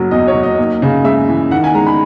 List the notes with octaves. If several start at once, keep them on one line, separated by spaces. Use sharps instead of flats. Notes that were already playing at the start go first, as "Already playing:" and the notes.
Already playing: F#1 F#3
E2 D#5
C#5
F#3
D#5
D#2
C#3
G#3 E5
E3
D#3 F#5
G#5
G#3 A#5
B5